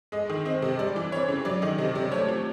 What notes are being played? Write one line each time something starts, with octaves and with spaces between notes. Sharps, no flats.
G#3 D#5
D#3
C4 D#5
C3
G3 D5
E3
C4 C#5
C#3
F#3 D5
D#3 D#5
C3 D#5
C3 D5
A3 C#5
F3